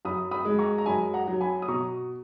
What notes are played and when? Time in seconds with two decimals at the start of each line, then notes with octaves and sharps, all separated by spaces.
0.05 F#2 B5 D#6
0.31 B5 D#6
0.45 G#3
0.59 A#5 C#6
0.78 A#5
0.86 F#2 G#5 B5
1.14 F#5 A#5
1.28 F#3
1.41 G#5 B5
1.62 D#6
1.68 B2 A#5 C#6